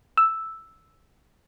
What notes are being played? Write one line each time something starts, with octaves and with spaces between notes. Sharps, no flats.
E6